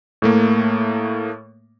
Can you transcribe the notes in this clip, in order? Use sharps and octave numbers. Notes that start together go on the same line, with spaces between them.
A2 A3 A#3